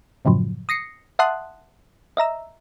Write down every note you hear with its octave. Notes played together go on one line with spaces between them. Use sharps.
F#2 A2 C#3 F3 F#3
D#6 A#6 C7 C#7
E5 F#5 A5 C6 D#6 F#6
D#5 E5 A#5 E6